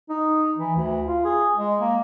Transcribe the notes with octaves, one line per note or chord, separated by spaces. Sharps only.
D#4
E3
D2
F4
G#4
G#3
A#3